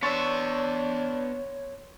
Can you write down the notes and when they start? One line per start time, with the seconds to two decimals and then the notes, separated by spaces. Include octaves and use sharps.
0.03 B3 D4 C#5 E5 C6 C#6 A6